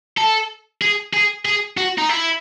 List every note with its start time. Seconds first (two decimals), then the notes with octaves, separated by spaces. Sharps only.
0.18 A4
0.82 G#4
1.13 G#4
1.45 G#4
1.77 F#4
1.98 D#4
2.09 E4